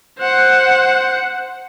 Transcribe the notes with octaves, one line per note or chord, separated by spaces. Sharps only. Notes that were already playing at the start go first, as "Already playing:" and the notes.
C5 F#5